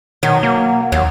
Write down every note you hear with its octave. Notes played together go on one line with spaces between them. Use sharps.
B2 D#3 F#3
A#3
D#2 F#3